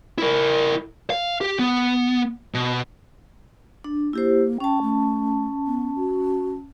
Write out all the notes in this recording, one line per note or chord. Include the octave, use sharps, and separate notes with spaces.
E4 A#4
F5
G4
B3
B2
D4
A#3 E4 G4 C5
C#4 G5 A5
A3
B3
F#4